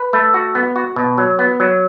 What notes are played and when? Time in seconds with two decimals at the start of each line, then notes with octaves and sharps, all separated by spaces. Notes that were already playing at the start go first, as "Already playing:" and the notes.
Already playing: B4
0.13 A3
0.34 F#4
0.55 B3
0.76 F#4
0.96 B2
1.18 F#3
1.39 B3
1.60 F#3